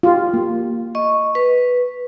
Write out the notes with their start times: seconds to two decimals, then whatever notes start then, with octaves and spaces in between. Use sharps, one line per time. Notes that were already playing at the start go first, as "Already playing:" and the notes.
0.03 F4 G4
0.34 A#3
0.95 D#5 C#6
1.35 B4